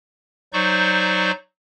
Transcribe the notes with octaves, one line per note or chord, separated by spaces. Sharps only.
F#3 D#4 C5 D5 C#6 G6